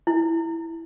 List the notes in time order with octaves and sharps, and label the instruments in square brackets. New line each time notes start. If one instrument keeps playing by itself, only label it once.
[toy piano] E4